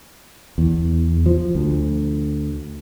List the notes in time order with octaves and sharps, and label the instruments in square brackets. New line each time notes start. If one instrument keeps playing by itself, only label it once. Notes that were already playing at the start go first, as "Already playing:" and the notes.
[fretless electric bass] E2
F3
D2